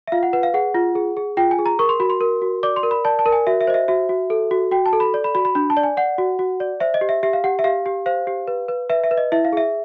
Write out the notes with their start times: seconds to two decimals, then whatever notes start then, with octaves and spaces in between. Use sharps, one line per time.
0.08 E5
0.12 F4 F5
0.23 F#5
0.33 B4 F#5
0.43 F5
0.54 G#4 F#5
0.75 F4
0.95 G#4
1.17 G#4
1.37 F4 G5
1.51 G#5
1.59 G#4
1.66 A#5
1.79 A#4 C#6
1.89 C6
2.00 F#4 B5
2.10 C6
2.21 A#4
2.42 F#4
2.63 D5 D6
2.76 C6
2.83 A#4
2.91 B5
3.05 D5 A5
3.19 A5
3.26 A#4
3.32 G#5
3.47 F#4 E5
3.61 E5
3.67 C5 D#5
3.74 E5
3.88 F#4 E5
4.09 F#4
4.30 A4
4.51 F#4
4.72 F#4 G5
4.86 A5
4.93 A4
5.00 B5
5.14 D5
5.24 B5
5.35 F#4 B5
5.45 B5
5.55 D4 B5
5.70 A5
5.77 D5
5.83 G#5
5.97 D5 F#5
6.18 F#4
6.39 F#4
6.60 D5
6.80 C5 E5
6.94 D#5
7.01 G4
7.09 E5
7.23 G4 E5
7.33 F5
7.44 G4 F#5
7.59 E5
7.64 G4 F5
7.86 G4
8.06 C5 F5
8.27 G4
8.47 B4
8.68 B4
8.90 B4 E5
9.04 E5
9.11 B4
9.17 D#5
9.32 E4 E5
9.45 F5
9.53 G#4 E5